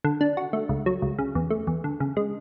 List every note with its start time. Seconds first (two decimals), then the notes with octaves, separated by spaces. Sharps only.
0.04 D3
0.21 D4
0.37 F#4
0.53 A3
0.69 C#2
0.86 F#3
1.02 C#2
1.19 C#3
1.35 E2
1.50 A3
1.67 E2
1.84 D3
2.00 C#3
2.17 G#3